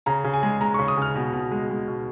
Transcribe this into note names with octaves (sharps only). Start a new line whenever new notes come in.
C#3 A#5
C#3
G#5
G#3
G#3 A#5
C#6
C#3
D#6
C#3 F6
B2
B2
G#3
G#3
B2